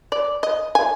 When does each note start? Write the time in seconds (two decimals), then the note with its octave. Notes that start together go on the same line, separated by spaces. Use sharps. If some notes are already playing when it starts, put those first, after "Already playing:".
0.12 D5
0.43 D#5
0.75 G#5